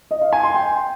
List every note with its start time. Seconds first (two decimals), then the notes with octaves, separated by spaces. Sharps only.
0.11 D#5
0.22 F5
0.33 G#5
0.43 C6
0.54 G5